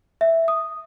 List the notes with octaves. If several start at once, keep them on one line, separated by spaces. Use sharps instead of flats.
E5
D#6